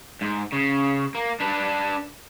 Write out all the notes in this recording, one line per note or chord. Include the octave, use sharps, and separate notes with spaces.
G#2
C#3
A#3
D4 B4